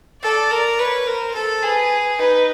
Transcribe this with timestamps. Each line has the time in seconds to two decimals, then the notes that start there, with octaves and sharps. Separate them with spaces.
0.22 A4 D5
0.51 A#4
0.79 B4 C#5
1.07 A#4 C5
1.34 A4
1.62 G#4 B4
2.19 D#4 B4